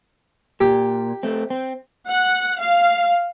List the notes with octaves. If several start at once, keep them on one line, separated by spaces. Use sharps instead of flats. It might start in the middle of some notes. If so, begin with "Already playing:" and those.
A#2 G4
A3 C4
C4
F#5
F5